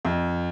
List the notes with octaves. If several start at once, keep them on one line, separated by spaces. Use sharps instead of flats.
F2